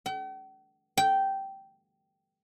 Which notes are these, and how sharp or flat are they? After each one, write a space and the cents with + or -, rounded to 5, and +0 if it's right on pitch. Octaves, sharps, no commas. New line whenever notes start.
G5 -45
G5 -10